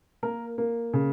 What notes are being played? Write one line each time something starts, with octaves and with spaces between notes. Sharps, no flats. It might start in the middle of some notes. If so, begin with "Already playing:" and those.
A#3 A#4
A#3
C#3